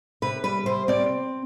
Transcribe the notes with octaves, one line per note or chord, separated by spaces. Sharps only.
C3 B4
G3 B4
C3 C5
C4 D5